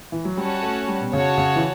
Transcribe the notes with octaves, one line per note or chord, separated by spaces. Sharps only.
E3
F#3
G3 C#4 F#4 C#5 F#5 A5
A3
G3
B2
C#3 F#4 C#5 F#5 A5
C#3
E3